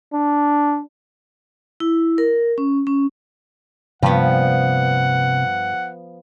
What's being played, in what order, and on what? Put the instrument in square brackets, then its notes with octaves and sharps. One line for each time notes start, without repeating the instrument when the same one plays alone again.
[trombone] D4
[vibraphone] E4
A#4
C#4
C#4
[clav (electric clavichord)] G2 [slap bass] C3 A#3 [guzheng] F3 B3 [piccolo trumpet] F#5